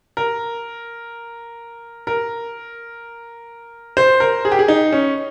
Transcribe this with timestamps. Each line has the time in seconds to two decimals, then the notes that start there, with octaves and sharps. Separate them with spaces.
0.17 A#4
2.07 A#4
3.97 C5
4.20 A#4
4.45 G#4
4.52 G4
4.59 G#4
4.68 D#4
4.93 C#4